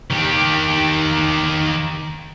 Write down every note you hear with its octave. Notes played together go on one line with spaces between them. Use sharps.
D#3 G4